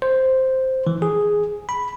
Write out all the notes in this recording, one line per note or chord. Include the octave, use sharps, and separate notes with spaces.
C5
E3
G#4
B5